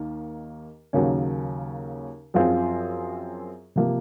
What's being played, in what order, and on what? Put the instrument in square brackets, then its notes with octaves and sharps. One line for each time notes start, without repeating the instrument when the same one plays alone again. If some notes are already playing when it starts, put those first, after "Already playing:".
Already playing: [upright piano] D#2 D#3 A#3
D#2 C#3 F#3 A#3 C#4
F#2 F3 C4 F4 G#4
C3 F3 A#3